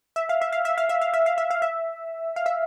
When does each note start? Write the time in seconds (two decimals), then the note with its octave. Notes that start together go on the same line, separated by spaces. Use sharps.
0.16 E5
0.29 F5
0.42 E5
0.52 F5
0.65 E5
0.78 F5
0.89 E5
1.01 F5
1.14 E5
1.26 F5
1.38 E5
1.50 F5
1.62 E5
2.36 F5
2.46 E5